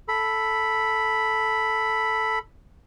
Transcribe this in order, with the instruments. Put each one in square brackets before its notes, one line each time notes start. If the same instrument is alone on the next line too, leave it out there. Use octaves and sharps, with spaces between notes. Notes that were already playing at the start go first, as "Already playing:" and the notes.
[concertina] A4 B5